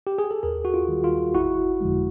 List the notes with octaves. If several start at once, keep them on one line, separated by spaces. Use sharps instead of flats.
G4
G#4
A4
D#2 G#4 A#4
F#4
F4
D#3 G3
F4
G1 E4 F#4
F2 D3 F3 G#3